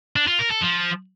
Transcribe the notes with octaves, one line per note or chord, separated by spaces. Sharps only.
D4
F4
A#4
A4
F3